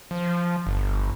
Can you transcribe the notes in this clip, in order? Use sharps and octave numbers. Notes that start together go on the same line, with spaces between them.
F3
G1